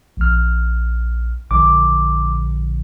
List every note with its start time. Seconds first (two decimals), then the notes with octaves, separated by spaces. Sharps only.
0.17 A#1 F6
1.51 A#1 D3 D6